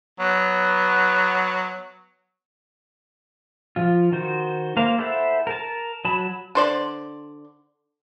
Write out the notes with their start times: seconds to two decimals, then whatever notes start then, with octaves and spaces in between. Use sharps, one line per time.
0.20 F#3 B3
3.76 F3 F4
4.12 D#3 F#4 C5
4.77 A#3 A#4 C5 F5
4.98 E4 A4 C5 E5 F#5
5.47 A#4 A5
6.05 F#3 A5 B5
6.55 D3 C5 D5